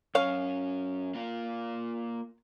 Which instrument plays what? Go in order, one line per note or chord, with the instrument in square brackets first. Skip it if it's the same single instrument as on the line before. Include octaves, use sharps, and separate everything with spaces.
[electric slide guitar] F#2 C#4 [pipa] C#5 F5
[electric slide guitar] A#3 F4